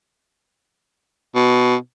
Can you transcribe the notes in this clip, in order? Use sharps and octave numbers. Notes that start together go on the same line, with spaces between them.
B2